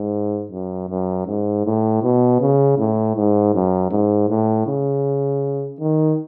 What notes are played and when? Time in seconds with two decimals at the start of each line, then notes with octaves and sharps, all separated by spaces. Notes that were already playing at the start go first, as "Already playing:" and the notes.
Already playing: G#2
0.52 F#2
0.89 F#2
1.27 G#2
1.65 A2
2.03 B2
2.40 C#3
2.78 A2
3.16 G#2
3.54 F#2
3.91 G#2
4.29 A2
4.67 C#3
5.80 D#3